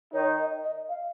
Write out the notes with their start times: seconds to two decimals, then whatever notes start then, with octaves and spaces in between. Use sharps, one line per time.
0.13 D#3 D#4 C#5
0.38 D#5
0.64 D#5
0.89 F5